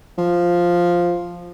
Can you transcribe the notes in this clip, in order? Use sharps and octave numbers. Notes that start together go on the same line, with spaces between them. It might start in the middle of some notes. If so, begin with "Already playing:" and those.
F3